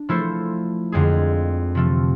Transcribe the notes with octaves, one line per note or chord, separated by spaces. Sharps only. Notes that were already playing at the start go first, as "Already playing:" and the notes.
Already playing: D4
F3 A3 E4 A4 C5
F2 D3 G#3 C4 G#4
C3 F3 A3